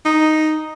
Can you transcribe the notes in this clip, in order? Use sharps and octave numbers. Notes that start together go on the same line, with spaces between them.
D#4